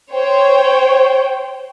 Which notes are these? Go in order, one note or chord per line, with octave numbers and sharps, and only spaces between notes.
C5 C#5 G5